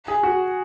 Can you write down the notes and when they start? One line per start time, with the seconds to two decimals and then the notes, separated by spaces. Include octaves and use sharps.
0.08 G#4
0.23 F#4